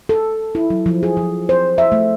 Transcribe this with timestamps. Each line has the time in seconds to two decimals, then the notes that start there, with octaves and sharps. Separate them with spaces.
0.09 A4
0.55 E4
0.70 F#3
0.86 F3
1.03 G#4
1.17 F3
1.49 C5
1.78 E5
1.92 A3